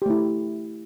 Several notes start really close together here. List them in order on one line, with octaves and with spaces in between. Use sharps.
G4 A3 E4